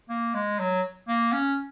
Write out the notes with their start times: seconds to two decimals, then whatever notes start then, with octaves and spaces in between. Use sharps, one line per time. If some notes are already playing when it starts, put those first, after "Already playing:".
0.10 A#3
0.34 G#3
0.59 F#3
1.08 A#3
1.33 C#4